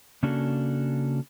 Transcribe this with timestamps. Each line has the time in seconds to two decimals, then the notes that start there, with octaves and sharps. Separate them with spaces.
0.23 C#3 A#3 C#4 D4 F#4 A4